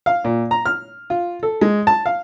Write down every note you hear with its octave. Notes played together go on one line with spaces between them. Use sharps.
F5
A#2
A#5
F6
F4
A4
G#3
A5
F5